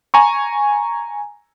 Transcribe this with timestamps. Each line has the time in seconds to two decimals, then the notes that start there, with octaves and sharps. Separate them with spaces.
0.14 G#5 A#5 C#6